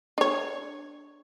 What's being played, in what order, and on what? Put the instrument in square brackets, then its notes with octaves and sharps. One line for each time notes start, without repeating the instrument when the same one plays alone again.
[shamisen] D4 C#5